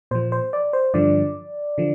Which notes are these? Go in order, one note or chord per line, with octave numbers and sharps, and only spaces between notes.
A#2 F3 C5
C5
D5
C5
G2 D3 F3 D5
D3 F3